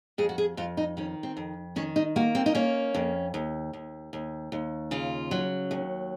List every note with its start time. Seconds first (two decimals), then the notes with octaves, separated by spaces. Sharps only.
0.18 F2 G#4
0.29 F#4
0.38 G#4
0.57 F2 F4
0.77 D#4
0.97 D#3 C#4
1.23 C4
1.37 F2
1.76 D#3 C#4
1.96 D#4
2.16 A#3 F#4
2.35 C4
2.46 D#4
2.55 A#3 C#4
2.94 F2
3.34 D#2
3.73 D#2
4.13 D#2
4.52 D#2
4.91 C#3 F4
5.31 F#3
5.71 D#2